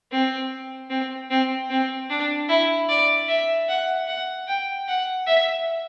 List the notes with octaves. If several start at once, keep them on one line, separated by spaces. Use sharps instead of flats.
C4
C4
C4
C4
D4
E4
D5
E5
F#5
F#5
G5
F#5
E5